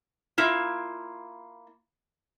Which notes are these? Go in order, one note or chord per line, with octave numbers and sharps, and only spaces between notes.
A#3 E4 F4